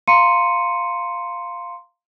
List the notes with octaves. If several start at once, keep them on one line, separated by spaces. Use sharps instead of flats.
F5 A#5 C6 C#7 D#7